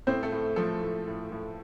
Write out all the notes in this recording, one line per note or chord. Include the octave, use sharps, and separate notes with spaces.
A2 C4 C5
A3 A4
A2
F3 A3 A4
A2
A2
A2